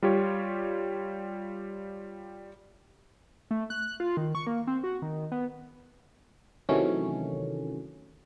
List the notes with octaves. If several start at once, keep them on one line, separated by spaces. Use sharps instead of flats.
G3 F4 G4 C#5
A3
F#6
F4
D#3
C#6
A#3
C4
F#4
D#3
B3
C3 D#3 E3 F#3 A3 C#4